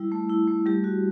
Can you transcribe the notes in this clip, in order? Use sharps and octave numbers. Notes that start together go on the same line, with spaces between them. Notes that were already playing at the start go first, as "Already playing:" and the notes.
Already playing: G3 E4
A3
E4
A3
G3 G4
F#4